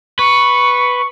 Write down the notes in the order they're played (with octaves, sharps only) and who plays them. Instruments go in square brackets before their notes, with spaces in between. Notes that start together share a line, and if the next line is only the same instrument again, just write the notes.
[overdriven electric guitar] B4 [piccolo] C#6